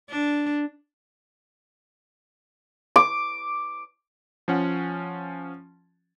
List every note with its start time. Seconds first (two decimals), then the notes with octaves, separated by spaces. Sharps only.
0.10 D4
2.96 D6
4.48 F3 C#4 F#5